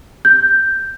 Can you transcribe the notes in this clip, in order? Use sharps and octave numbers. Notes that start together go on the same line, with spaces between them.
G6